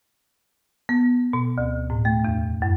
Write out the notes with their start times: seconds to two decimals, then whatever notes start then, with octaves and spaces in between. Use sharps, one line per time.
0.89 B3
1.33 B2
1.58 D2
1.90 A2
2.05 A3
2.25 E2
2.62 F#2